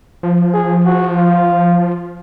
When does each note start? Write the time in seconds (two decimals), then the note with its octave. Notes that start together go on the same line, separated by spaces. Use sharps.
0.23 F3
0.54 G#4
0.85 F#4
1.17 F4